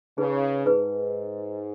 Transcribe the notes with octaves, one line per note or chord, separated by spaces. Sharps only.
C#3 D#4 G#4 B4
G#2 D#4 G#4 B4